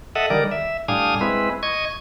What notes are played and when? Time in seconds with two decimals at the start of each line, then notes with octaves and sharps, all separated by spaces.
0.15 A4 D#5 E5 F#5
0.30 D3 D#3 G3 A#4 D5
0.51 E5
0.88 A2 G3 D4 F5 G#5 D#6
1.21 G#3 C4 E4 B4
1.63 D#5 C#6 G#6